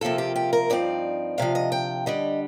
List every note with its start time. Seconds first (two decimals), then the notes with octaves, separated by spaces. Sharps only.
0.01 C3 F3 A#3 F4 A4
0.18 G4
0.36 G4
0.53 A#4
0.70 G2 F3 C4 D#4 D5
1.38 D2 C3 F3 F5
1.55 D#5
1.72 G5
2.06 D3 G3 D4 D#5